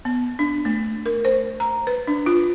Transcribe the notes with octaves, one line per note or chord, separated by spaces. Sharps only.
B3
D4
A3
A#4
C5
A#5
B4
D4
F4